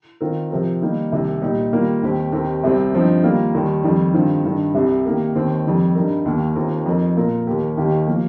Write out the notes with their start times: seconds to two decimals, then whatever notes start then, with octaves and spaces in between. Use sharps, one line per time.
0.21 D#3 C4 F4 A#4
0.51 C3 F3 C4 G4 A#4
0.82 D#3 G3 A#3 D#4 G4
1.12 C2 C3 D#3
1.42 A#2 G3 D#4 G4
1.73 D#3 G3 A#3 F4 A#4
2.03 D#2 D#3 C4 G4
2.32 D#2 D#3 C4 G4 A#4
2.63 C2 C3 G3 C4
2.93 G2 F3 C4 D#4
3.23 D#3 G3 A#3 F4 A#4
3.54 D#2 D#3 G3
3.83 F2 D#3 G3
4.14 G2 D#3 C4 F4
4.45 G2 D#3 G3
4.74 C2 C3 G3
5.05 D#3 A#3 G4 A#4
5.35 D#2 D#3 C4
5.66 F2 D#3 G3
5.95 G2 G3 D#4 A#4
6.26 D#2 D#3 A#3
6.56 D#2 D#3 C4 F4 A#4
6.86 F2 F3 D#4 A#4
7.16 A#2 A#3 F4 A#4
7.47 D#2 D#3 A#3 G4 A#4
7.77 D#2 D#3 A#3 D#4 G4
8.07 F3 A#3